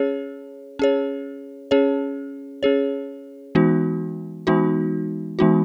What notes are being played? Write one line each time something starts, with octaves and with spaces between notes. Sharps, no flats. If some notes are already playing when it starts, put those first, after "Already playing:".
Already playing: C#4 G#4 C#5
C#4 G#4 C#5
C#4 G#4 C#5
C#4 G#4 C#5
E3 G#3 B3 D#4 F#4
E3 G#3 B3 D#4 F#4
E3 G#3 B3 D#4 F#4